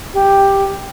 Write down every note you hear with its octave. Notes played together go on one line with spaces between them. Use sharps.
G4